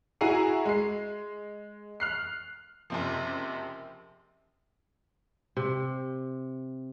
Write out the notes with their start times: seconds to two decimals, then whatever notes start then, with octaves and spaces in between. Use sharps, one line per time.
0.21 E4 F#4 G#4 A#5 C7 D#7
0.66 G#3 C7
2.00 F6 F#6 C7
2.90 F#1 C3 F3
5.57 C3